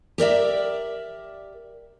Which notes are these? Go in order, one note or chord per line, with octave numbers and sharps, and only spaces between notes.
G4 A#4 D5 E5